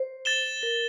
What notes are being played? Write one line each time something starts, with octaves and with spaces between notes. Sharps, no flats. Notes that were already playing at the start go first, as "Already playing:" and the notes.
Already playing: C5
A6 E7 G7
A#4